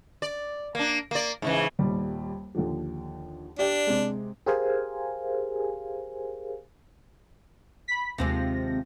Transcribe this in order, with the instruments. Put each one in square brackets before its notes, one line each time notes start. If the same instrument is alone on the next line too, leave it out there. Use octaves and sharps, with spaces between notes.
[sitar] D5
A#3 D4
A#3 D5
G#2 C#3 E3
[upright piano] D#1 D#2 G3
D#2 D3 F3
[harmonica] D4 [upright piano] G4 D5 G7
[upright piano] C3 G#3
[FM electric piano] G4 G#4 A#4 C5 F5 G#5
[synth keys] B5 B6
[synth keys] D#2 C4 A#6 [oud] C3 F3 G#3